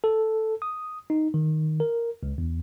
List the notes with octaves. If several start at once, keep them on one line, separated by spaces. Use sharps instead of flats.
A4
D#6
D#4
D#3
A#4
C#2
E2